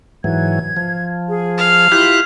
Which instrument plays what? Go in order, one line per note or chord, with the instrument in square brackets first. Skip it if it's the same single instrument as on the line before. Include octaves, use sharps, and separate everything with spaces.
[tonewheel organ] G#2 E3 F#3 [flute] G#6
[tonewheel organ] F3
[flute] G#4
[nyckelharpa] F5
[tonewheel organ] E4 G4 F#6 [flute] F4